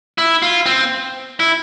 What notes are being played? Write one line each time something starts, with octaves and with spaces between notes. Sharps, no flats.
E4
F4
C4
E4